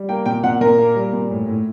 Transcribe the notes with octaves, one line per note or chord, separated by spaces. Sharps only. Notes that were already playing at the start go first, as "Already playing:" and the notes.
Already playing: G3
A#3 G5
A#2 G5
A#2 F#5
A#2 A#4
A#3
G3
A#2
A2
A2